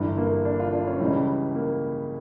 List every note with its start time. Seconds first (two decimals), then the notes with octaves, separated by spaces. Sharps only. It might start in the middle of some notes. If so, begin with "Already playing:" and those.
Already playing: G1 G2 E3 G3
0.18 A#3
0.45 D4
0.60 F4
0.73 D4
0.87 C#4
1.00 C#2 C#3 E3 G3 C#4
1.55 A#3